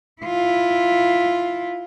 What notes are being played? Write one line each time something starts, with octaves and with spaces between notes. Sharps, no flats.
E4 F4